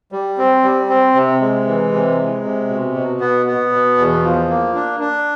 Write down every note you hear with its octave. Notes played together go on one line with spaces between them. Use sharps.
G3
C4
G3
C4
C3
G#3
E3
C3
G#3
C3
B2
B2
B3
B3
B2
E2
F3
A#3
D4
D4